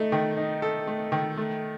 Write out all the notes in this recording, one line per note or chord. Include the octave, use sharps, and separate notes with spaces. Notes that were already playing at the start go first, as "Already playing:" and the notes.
Already playing: A3 D#4
D#3
D#4
A4
A3
D#3
A3